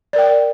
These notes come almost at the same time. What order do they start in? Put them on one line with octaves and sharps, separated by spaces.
D5 A#4 G5